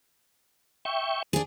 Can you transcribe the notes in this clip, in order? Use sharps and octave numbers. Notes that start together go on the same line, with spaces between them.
E5 G5 C#6
D4 G#4